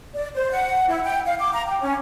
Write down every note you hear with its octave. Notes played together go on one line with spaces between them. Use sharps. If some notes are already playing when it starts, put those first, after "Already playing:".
D5
C5
F#5
E4
G5
F5
D6
A#5
G5
C#4